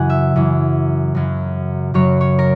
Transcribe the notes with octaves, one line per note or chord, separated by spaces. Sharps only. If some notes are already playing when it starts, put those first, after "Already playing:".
Already playing: F#2 C#3 E3 F#5 G#5
E5
F#2 E3
F#2 C#3 F#3
F#2 C#3 F#3 C#5
C#5
A#4